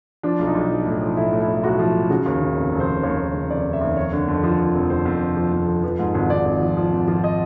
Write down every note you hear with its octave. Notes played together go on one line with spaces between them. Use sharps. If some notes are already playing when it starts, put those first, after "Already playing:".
F3 D4
B1
D#4
B1
F3
A2
F3
A2 E4
A2
E4
B1
B1 F#4
F3
A2
C#3 F#4
D#2
C#3
F1
F1
C5
F1
D#2 C#5
D#2
C#3
F1 D5
F1
E5
D#2
F1 C#5
D3
F2
F3
F3
F1
F2 C5
F2
F1
F3
F2
F2
F3 B4
G#2
G#1
G#1 D5
G#1
F3
F3
G#1
F3
D#5